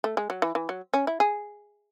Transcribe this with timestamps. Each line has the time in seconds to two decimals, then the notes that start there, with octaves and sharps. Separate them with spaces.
0.04 A3
0.17 G#3
0.30 F#3
0.42 E3
0.55 E3
0.69 F#3
0.94 C#4
1.07 E4
1.20 G#4